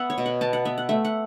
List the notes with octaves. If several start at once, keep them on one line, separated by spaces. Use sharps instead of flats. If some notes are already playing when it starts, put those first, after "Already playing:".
Already playing: B3 E5 F#5
C#5
B2
F#5
B3 A5
F#5
B3 E5
F#5
A3 E5
F#5